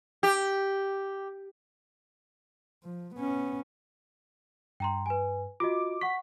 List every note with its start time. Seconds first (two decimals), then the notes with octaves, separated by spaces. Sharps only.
0.23 G4
2.84 F3
3.15 B3 C#4
4.80 G2 G5 A#5 C6
5.06 B4 G#5
5.60 F4 F#4 D#5 D6
6.01 F#5 C#6 B6